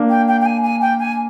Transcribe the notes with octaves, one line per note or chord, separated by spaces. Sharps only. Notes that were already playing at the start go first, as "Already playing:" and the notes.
Already playing: A#3 D4
G5
G5
G5
G#5
G#5
G5
G#5